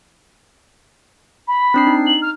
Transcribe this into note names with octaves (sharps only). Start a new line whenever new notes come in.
B5
C4 D4 C7
D#4
F#7
F6